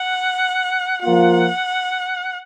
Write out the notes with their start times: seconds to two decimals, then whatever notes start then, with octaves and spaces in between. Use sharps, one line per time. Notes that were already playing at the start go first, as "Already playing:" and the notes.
Already playing: F#5
1.02 F3 A#3 F4 F#5